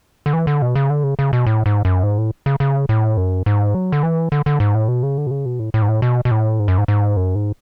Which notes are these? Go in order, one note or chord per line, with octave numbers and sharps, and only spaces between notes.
D3
E3
D3
B2
C#3
D3
C#3
C#3
B2
A2
G#2
F#2
G#2
A2
C#3
C#3
A2
F#2
G#2
F#3
D3
E3
D3
D3
G#2
A2
B2
C#3
D3
B2
C#3
B2
A2
A2
G#2
A2
B2
B2
A2
G#2
F#2
G#2
G#2
F#2
G#2